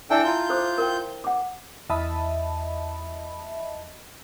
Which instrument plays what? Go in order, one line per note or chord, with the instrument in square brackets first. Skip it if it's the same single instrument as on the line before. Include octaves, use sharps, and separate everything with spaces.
[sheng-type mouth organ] D4 A4 G5 [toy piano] E4 E5 G#5
[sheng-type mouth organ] F4 G6 [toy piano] A5 A#5
[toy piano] A4 C5 D6
A#4 G5
F#5 D6
[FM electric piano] E2 D#5 E5 A5 B5